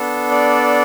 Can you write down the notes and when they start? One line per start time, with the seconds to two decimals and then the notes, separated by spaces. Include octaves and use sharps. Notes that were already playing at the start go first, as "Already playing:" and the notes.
Already playing: B3 D4 A4
0.31 D5